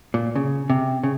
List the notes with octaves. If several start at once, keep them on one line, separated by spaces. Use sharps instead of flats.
A#2
C#3
C3
C#3